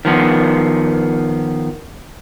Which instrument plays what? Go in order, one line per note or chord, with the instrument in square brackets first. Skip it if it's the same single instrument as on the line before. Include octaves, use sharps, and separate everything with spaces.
[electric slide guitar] D#3 F3 B3